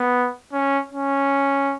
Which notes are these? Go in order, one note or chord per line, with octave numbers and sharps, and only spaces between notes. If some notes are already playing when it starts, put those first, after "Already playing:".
Already playing: B3
C#4
C#4